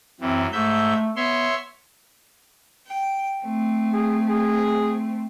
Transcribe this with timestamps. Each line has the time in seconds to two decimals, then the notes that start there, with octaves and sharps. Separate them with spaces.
0.21 F#2 E3 C4
0.52 G#2 A3 E5 G6
1.16 B3 C#5 E5 C6
2.87 G5
3.41 A3 C4
3.93 G#4
4.29 G#4